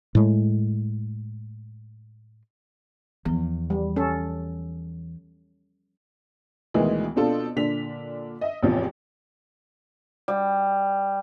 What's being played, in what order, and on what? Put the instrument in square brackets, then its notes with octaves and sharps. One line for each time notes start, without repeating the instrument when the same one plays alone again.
[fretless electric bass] A2 G#3
[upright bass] E2 [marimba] F3 B3
[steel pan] G3
C#4 A4
[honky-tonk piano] D2 B2 D#3 E3 G#3
B2 C4 D4 F4 A4
A#2 D3 D4 B6 F7
D#5 E5
A1 E2 C3 F3
[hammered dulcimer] G3